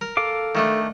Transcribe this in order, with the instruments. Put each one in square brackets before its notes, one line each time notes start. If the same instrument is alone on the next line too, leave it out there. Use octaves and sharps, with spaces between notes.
[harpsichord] A#4
[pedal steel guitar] A4 F5 D6
[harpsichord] D#3 A3 D4